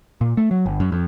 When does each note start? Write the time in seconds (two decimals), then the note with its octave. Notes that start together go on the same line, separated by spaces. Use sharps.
0.21 A#2
0.37 A3
0.51 F#3
0.66 G1
0.80 F#2
0.92 F2